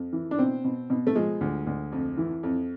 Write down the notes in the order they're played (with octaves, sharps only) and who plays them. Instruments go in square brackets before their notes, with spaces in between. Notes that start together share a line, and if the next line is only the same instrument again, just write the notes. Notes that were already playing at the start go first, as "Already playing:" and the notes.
Already playing: [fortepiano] F2
E3
D4
B2 C4
B2
B2
A3
F3 G#3
D2
D2
F2
E3
F2